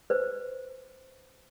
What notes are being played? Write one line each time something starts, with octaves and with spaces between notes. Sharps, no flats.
B4 C5